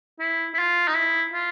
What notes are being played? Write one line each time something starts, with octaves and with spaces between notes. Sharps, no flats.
E4
E4
F4
D#4
E4
F4